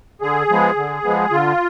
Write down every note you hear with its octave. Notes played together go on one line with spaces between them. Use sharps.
D3 G#4
F3 G#3 B3
D3
F3 G#3 B3
D3 F4